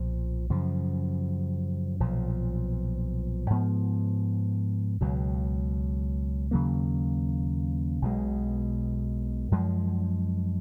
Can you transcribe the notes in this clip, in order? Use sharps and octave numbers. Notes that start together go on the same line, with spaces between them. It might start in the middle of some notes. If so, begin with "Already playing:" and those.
Already playing: B1 A#2 F3
F#2 C#3 F3
B1 A#2 F3
G#2 F3 B3
C#2 B2 F#3
D#2 C#3 F#3 A#3
B1 B2 G#3
F#2 F3 G#3